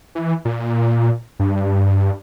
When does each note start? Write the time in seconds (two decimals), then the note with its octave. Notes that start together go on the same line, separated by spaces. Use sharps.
0.15 E3
0.45 A#2
1.40 G2